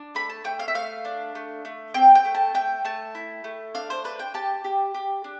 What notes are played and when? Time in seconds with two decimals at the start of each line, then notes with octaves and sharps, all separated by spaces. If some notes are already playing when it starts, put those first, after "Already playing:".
Already playing: D4
0.15 A3 B5
0.29 A5
0.44 A3 G5
0.59 F5
0.68 E5
0.75 A3 F5
1.05 D4
1.35 A3
1.65 A3
1.94 C4 G5
2.15 G5
2.25 A3
2.35 A5
2.54 A3 G5
2.85 A3 A5
3.15 E4
3.44 A3
3.75 D4 F5
3.90 C5
4.04 D4 B4
4.19 G5
4.34 G4 A5
4.64 G4
4.94 G4
5.24 D4